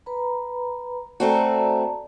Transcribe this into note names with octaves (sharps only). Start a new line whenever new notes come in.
B4 A#5 B5
A3 C4 F#4 D5 A5 A#5